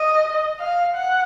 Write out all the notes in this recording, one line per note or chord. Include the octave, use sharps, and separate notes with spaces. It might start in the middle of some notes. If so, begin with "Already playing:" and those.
Already playing: D#5
F5
F#5